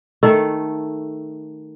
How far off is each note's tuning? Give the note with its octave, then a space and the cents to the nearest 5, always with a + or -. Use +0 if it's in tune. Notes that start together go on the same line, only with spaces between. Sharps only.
D#3 +0 A3 +0 A4 +0